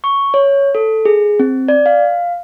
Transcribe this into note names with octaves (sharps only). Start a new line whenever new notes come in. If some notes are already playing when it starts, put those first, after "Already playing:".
C#6
C#5
A4
G#4
C4
D5
F5